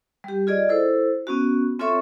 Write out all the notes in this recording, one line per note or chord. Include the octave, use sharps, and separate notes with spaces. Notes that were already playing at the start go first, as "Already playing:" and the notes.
G3 G4
F4 G#4 D5 D#5
E4 A4 C5
B3 C#4 F#4
C4 F4 A4 C#5 E5 C#6